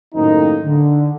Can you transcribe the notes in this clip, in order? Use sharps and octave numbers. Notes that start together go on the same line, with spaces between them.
F#2 A2 D#3 A#3 C4 D#4
D3